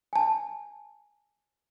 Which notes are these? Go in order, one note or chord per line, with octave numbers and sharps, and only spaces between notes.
G#5 A5